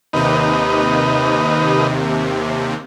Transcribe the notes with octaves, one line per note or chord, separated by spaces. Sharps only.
D#2 C3 D#4 B4